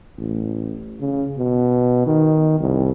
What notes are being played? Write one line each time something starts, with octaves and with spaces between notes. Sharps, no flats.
A1
C#3
B2
D#3
C2